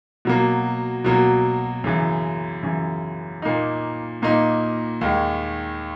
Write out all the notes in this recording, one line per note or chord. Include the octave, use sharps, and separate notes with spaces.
B2 F#3 A#3
B2 F#3 A#3
F#2 C#3 E3
F#2 C#3 E3
A#2 A#3 D#4
A#2 A#3 D#4
D#2 D#3 G#3